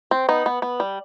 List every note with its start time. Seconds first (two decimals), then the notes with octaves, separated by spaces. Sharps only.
0.11 C4
0.29 B3 D#4
0.46 B3
0.62 B3
0.80 G3